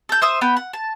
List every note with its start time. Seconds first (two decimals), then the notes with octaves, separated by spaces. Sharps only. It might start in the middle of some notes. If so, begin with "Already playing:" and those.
0.09 A4 G6
0.22 C5 E5 D#6
0.41 B3 G5 B5
0.57 F#5
0.73 A5